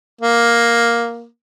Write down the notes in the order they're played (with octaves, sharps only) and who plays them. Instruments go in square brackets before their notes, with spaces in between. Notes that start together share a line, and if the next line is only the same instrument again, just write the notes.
[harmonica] A#3